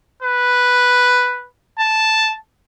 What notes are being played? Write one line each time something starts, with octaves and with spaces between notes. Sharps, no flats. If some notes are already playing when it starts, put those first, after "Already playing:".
B4
A5